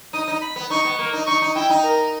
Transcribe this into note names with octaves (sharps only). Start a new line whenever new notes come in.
D#4 D#6
D#4
B5
B3
D#4 C#6
B3
A#3
D#4
D#4 C#6
D#4
E4 G5
D#4
A#4